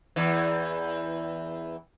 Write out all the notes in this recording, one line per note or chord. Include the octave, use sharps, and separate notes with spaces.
E2 E3